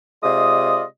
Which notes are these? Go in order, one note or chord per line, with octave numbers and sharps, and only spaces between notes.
C3 G#3 F4 D5 D#5 D#6